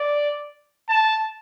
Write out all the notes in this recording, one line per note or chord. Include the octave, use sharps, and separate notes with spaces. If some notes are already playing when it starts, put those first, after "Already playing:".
Already playing: D5
A5